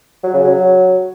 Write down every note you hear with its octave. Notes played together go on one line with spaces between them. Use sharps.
F#3
C#3
F#3